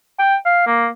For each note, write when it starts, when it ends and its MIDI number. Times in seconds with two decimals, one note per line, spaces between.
0.19 0.36 79
0.45 0.63 77
0.67 0.88 58